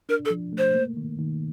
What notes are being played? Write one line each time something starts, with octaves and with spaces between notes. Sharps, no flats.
D4 A#4
A4
F3
A3
C5
A#3
D#3
D#3